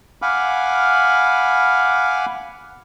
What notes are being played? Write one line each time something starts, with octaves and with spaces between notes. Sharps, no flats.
F5 F#5 G#5 B5 D6 F6